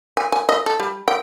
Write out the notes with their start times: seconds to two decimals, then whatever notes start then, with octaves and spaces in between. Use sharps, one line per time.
0.17 G#5
0.32 G#5
0.49 D#5
0.66 A4
0.80 G3
1.08 G5